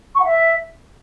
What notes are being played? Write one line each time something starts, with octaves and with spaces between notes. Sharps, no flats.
C#6
F#5
E5